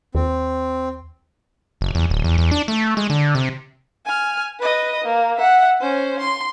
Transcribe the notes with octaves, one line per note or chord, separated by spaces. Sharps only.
D#2 C4
F#1
E2
D1
E2
E2
D4
A3
G#3
D3
C3
G#5 F6
B4 D#5
A#3
E5 F#5
C#4 C5
C6